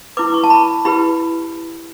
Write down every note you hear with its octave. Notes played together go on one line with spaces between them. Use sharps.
E4 B4 D6
C#6
A5
B5
E4 G4 B4 B5